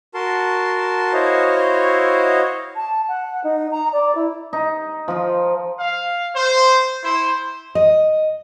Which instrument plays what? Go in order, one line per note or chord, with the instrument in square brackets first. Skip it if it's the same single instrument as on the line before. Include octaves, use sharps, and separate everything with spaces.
[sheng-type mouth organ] F#4 A#4 A5 C6
E4 F#4 C5 C#5 D#5 F5
[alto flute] A5
F#5
D#4
A#5
D5
E4
[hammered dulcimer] D#4
F3 F4
[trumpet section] F5
C5
E4 C5
[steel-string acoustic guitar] D#5